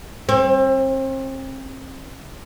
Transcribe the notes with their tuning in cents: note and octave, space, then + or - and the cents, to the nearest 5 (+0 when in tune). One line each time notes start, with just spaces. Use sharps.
C4 +35